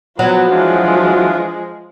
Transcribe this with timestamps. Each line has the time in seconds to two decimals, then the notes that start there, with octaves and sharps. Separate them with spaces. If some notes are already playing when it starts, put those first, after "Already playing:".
0.19 F3 F#3 B3
0.51 E3 G#3 D4 F4